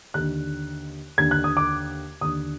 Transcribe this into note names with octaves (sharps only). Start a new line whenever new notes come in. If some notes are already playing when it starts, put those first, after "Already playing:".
D#2 D3 F#6
D#2 D3 G#6
F#6
D#6
D6
D#2 D3 D#6